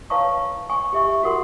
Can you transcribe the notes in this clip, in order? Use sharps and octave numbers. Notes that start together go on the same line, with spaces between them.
B4 C#5 F5 A5 A#5 C#6
G#5 C#6
G4 E5 C#6
F#4 A4 A#4 F#5 B5 C6